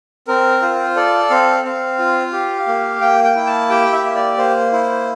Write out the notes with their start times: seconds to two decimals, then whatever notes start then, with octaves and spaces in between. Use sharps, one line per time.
0.28 C4 A#4
0.62 F4 C5
0.96 A4 D5
1.30 C4 F5
1.64 C4 F5
1.99 F4
2.33 G4
2.67 A#3
3.01 A#3 G5
3.24 G5
3.35 E4
3.47 A5
3.69 G4 G5
3.92 E5
4.04 A#3
4.15 D5
4.38 A#3 C5
4.72 E4 C5